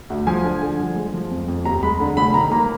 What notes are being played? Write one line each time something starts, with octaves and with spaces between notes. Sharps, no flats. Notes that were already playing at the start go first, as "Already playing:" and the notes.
D2
F3 G#5
D3
D3
F3
G#3
F3
F2
F2
D#2 A#5
G#3 B5
D3
F1 B5
D#3 A#5
A#3 A#5